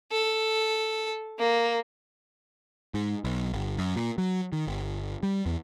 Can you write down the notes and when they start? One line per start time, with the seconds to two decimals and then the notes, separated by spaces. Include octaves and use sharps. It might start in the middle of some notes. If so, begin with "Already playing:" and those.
0.12 A4
1.39 A#3
2.94 G#2
3.24 B1
3.53 G1
3.78 F#2
3.96 A#2
4.18 F#3
4.53 D#3
4.67 G1
5.23 G3
5.46 E2